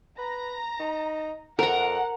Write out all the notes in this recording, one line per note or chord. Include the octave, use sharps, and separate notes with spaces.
B4 A#5
D#4
F2 A#4 F#5 A#5